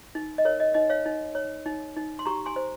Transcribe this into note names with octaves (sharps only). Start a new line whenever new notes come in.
D#4
D#5
A#4 C#5
D#5
D#4 D#5
C#5 F5
D#4
C#5
D#4
D#4
C6
G4 A#5 C#6
G#5 C6
C5